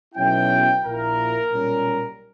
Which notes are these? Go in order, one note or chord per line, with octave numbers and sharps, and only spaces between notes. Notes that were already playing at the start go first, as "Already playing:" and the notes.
B1 B2 F#3 C#4 E4 G5
A#1 A#2 A#3 E4 A#4
B1 A#2 G3 C#4